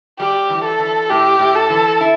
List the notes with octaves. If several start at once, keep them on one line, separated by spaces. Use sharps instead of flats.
G3 G4
E3
A4
E3
A2 G4
A2
A4
E3
E4